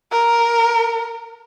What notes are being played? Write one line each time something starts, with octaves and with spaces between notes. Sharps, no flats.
A#4